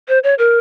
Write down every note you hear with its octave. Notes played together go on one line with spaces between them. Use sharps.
C5
C#5
A#4